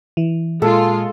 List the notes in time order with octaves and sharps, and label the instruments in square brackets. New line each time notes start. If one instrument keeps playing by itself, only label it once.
[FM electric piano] E3
[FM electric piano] A#2 [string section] G#3 F4 [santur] A4